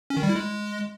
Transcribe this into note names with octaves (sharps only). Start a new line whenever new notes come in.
C#4
D#3
G3
E4
G#3